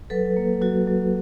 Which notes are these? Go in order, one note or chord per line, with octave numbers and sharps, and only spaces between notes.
F#3 A4 B4
A#3
F#3 F#4
F#3